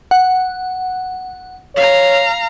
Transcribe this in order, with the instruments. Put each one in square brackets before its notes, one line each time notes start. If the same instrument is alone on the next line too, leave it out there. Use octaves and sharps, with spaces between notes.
[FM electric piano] F#5
[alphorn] C#5 [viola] F5 A#5